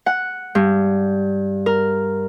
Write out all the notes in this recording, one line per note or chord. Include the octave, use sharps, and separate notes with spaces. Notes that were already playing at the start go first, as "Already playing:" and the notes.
F#5
G2
A#4